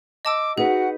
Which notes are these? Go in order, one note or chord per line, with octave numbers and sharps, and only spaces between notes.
D#5 A5 D6 E6
D#4 F#4 G#4 B4 F#5